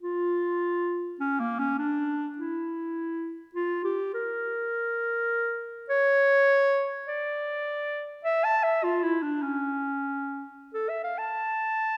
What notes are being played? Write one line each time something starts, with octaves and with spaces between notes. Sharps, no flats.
F4
C#4
A#3
C#4
D4
E4
F4
G4
A#4
C#5
D5
E5
A5
E5
F4
E4
D4
C#4
A4
E5
F5
A5